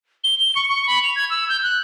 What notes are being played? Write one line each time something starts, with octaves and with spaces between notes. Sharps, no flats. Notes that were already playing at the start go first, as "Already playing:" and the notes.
G7
G7
C#6
C#6
B5
F7
G#6
E6
G6
F#6